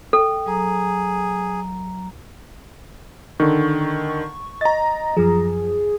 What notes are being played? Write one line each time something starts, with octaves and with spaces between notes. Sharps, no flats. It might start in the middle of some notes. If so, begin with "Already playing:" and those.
A4 G5
F#3 G#4 A#5
D3 D#3 C#6
D#5 A#5 A6
F#2 F3 G#4